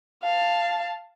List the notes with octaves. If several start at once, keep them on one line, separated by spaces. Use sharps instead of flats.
F5 A5